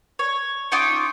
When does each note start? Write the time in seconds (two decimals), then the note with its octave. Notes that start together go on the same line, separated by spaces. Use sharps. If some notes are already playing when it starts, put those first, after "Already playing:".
0.19 C#5
0.72 C#4 D#4 F4 D6